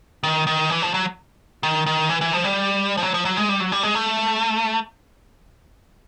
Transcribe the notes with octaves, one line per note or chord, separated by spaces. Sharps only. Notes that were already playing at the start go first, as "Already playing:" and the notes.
D#3
D#3
E3
F3
F#3
D#3
D#3
E3
E3
F3
G3
F3
F#3
F3
F#3
G#3
G3
F#3
G3
G#3
A3